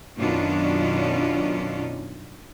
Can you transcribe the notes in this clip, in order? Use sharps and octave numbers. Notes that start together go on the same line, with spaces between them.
F#2 B2 D#3 C#4 D4 F4